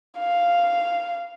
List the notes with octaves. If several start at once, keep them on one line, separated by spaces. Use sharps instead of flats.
F5